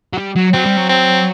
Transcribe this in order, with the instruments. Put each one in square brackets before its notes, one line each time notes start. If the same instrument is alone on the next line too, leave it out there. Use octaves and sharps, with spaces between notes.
[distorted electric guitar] F#3
G3
F#3
[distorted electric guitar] F#3 [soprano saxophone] C4
[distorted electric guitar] G3
F#3
[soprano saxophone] C4